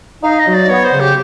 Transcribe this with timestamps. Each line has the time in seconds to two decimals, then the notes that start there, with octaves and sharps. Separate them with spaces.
0.23 D#4 F5
0.39 D#5
0.47 F#3
0.54 D5
0.69 B3 C#5
0.84 C5
0.92 C#3
1.00 G4